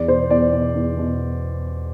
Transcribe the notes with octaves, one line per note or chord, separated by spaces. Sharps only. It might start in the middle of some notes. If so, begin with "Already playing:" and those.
Already playing: E2 D5
B2 C5
E2 D5
B2
E2
B2